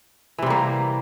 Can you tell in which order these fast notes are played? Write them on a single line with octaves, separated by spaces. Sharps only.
E3 C3 G3 A#3